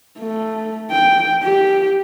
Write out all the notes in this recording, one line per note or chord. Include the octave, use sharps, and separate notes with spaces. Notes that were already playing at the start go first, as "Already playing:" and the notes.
A3
G5
G4